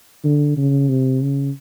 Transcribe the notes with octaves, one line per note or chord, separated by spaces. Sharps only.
D3
C#3
C3
C#3